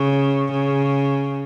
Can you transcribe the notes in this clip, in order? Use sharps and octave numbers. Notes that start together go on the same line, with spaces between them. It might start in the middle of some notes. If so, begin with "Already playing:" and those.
Already playing: C#3
C#3